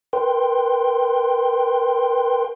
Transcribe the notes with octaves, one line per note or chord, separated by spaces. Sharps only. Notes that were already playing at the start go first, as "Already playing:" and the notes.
A#4 B4 G5 C6